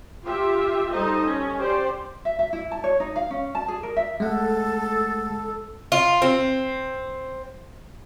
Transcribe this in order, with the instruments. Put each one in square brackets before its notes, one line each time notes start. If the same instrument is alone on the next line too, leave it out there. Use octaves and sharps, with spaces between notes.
[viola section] F4 G4 E5
G3 D#4 A4 C5 D#5
C#4
G4 C5 D5
[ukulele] E5
E5
E4
A5
C#5
D#4
F5
C#4
A5
G#4
A#4
E5
[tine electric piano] G#3 A3 F#5 [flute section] A4
[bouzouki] F4
C4